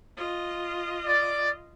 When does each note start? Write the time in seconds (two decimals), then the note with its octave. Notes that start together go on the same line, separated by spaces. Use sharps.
0.17 F4 D#5
1.06 D5